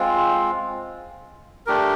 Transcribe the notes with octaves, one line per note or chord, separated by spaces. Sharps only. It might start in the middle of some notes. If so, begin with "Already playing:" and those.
Already playing: G#3 C4 F4
A3 D4 G4 A#4